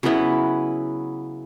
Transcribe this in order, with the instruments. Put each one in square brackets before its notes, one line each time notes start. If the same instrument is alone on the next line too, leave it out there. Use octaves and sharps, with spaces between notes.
[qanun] C#3 F#3 B3 E4